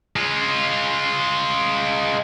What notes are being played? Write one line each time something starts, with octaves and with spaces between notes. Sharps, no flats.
G#3 F4